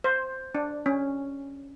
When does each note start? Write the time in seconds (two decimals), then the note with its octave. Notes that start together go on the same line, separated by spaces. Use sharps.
0.04 C5
0.55 D4
0.86 C#4